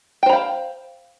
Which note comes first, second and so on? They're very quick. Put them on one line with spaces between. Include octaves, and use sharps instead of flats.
G5 C5 B5 F5